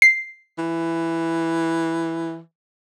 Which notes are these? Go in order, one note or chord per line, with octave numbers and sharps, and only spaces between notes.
C7
E3